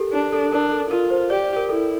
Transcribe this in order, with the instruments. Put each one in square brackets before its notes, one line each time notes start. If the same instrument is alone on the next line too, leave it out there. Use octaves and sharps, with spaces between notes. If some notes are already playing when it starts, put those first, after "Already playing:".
Already playing: [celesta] G4 A4 A#4
[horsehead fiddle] D4
[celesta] A4
[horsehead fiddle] D4 [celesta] A#4
[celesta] A4
[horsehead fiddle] F4 [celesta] A#4
[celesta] C5
[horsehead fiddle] G4 [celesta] D5
[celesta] D5
A#4
[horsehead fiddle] E4 [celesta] A4